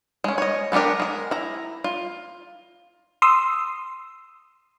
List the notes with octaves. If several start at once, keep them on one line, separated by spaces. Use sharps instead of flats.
G#3 C#4
C#5 D#5
G#3 B3 D4 G4 A#4
G#3 A#4
E4 A#5
F4
C6 D#6 E6